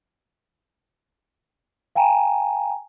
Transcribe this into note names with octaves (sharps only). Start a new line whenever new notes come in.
F5 G5 G#5 A#5